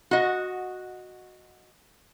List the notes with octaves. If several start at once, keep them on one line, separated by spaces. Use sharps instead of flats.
F#4 D#5